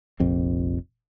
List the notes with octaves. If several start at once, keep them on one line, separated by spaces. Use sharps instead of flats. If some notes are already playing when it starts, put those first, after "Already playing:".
F1 A#1 F2 C4